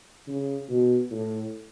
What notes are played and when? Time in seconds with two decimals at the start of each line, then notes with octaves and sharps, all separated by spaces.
0.27 C#3
0.69 B2
1.11 A2